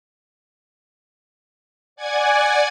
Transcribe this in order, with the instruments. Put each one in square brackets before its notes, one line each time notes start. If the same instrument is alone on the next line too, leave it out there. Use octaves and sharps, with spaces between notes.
[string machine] D5 F#5 G#5 G#6